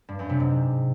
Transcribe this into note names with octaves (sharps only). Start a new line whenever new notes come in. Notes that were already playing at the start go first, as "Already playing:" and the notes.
G2
F#2
C3
G#2